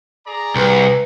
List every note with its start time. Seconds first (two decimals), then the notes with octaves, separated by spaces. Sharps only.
0.25 G#4 D5 A#5
0.56 C2 B4